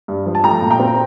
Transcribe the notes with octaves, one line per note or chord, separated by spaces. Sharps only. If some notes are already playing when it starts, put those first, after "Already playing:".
G2
F3
A5
A3 G5 A#5
A#2
G5 A#5
C4